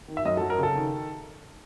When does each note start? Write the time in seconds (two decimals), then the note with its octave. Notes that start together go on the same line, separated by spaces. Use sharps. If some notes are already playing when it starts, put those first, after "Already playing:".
0.08 D#3
0.17 E5
0.25 F#2 D#5
0.37 A4
0.41 F#3
0.50 A#4
0.58 C#3 A4
0.75 D#3